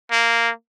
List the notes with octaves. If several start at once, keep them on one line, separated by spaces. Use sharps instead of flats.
A#3